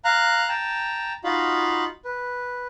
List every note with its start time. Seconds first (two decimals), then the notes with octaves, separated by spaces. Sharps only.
0.05 F5 A#5 F#6
0.49 G5 A5 A#5
1.24 D#4 F4 F#4 D#5 F5 B5
2.05 B4